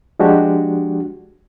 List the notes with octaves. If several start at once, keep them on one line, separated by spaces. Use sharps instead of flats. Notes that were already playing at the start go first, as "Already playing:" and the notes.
F3 G#3 D4 F#4 G4